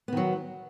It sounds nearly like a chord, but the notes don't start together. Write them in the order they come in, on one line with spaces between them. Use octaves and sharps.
B3 D#3 F#3